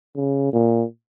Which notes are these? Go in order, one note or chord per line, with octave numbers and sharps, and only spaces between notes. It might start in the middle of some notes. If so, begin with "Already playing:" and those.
C#3
A#2